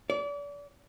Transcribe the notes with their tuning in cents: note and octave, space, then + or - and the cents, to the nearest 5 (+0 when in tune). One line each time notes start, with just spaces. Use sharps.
D5 -35